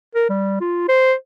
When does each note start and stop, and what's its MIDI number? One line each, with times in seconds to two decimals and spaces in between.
0.15 0.25 70
0.29 0.61 55
0.61 0.88 65
0.89 1.14 72